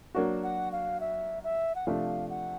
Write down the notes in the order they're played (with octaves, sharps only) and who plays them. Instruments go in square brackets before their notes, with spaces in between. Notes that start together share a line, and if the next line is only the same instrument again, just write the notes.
[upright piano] F#3 A#3 D4 F#4
[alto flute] F#5
F5
E5
E5
F#5
[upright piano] C3 F3 A3 D4 [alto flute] F5
[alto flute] F#5